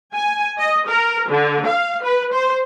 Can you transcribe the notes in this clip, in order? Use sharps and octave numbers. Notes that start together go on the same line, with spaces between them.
G#5
D#5
A#4
D3
F5
B4
C5